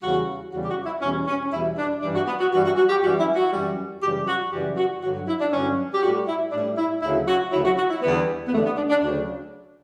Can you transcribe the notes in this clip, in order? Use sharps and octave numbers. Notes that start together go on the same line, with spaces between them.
E2 C#3 G3 F#4
E2 C#3 G3 F#4
G4
F#4
E4
E2 B2 G3 C#4
C#4
E2 B2 G3 E4
D4
G2 E3 G3 D4
F#4
B3
F#4
G2 E3 G3 F#4
F#4
F#4
G4
F#2 E3 G3 F#4
E4
F#4
F#2 E3 G3
F#2 C#3 E3 G3 G4
F#4
F#2 C#3 E3 G3 G4
F#4
G2 D3 F#3 F#4
F#4
E4
D4
G2 D3 F#3 C#4
G4
A2 G3 F#4
E4
A2 G3 D4
E4
D2 C#3 F#3 E4
F#4
D2 C#3 F#3 E4
F#4
F#4
E4
E2 D3 G3 B3
B3
E2 D3 G3 A3
B3
D4
D4
D2 C#3 F#3 D4